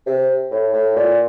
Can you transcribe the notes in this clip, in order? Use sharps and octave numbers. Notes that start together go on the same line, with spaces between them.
C3
A2
A2
A#2